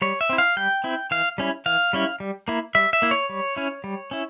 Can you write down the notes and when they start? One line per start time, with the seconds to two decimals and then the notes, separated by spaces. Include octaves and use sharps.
0.02 G3 C#5
0.21 E5
0.29 C4 E4
0.38 F5
0.57 G3 G5
0.84 C4 E4
1.11 E3 F5
1.38 G3 C#4 E4
1.66 E3 F5
1.93 G3 C#4 E4
2.20 G3
2.48 A#3 E4
2.75 G3 E5
2.93 E5
3.02 A#3 E4
3.11 C#5
3.29 G3
3.56 C#4 E4
3.84 G3
4.11 C#4 E4